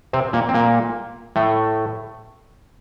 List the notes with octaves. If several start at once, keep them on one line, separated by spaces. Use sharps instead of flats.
C3 C4
A#2 A#3
C4
A#2 A#3
A2 A3